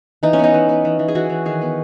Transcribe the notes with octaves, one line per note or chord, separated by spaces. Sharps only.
E3 D#4
C#4
B3 D#4
E3
B3
E3
E3
G#4
E3 F#4
E3
D#3 G#4
B3